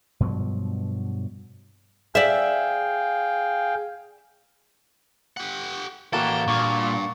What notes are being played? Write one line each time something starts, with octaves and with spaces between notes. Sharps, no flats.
G2 B2 F3 F#3
G#4 D5 E5 F5 G5
G4 F#5
E3 A#3 F#4 A4 G5 A6 E7
G2 A#2 C#6 D6